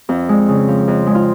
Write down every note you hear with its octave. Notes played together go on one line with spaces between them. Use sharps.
F2
G#3
C#3
F3
F2
G#3
F4